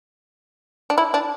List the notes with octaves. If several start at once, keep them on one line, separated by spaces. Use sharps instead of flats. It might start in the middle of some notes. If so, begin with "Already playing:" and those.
D4
E4
D4